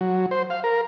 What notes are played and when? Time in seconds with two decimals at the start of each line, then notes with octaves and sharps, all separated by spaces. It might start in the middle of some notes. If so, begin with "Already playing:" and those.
0.01 F#3
0.31 C5
0.50 F5
0.64 A#4